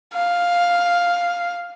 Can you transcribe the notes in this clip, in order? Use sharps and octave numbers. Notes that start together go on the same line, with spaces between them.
F5